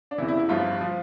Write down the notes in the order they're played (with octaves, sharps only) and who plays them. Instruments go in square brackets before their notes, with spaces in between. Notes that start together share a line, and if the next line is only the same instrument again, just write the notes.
[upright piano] D4
E2 C3 E3 E4
E4
E4
G1 G2 F3 F4
F3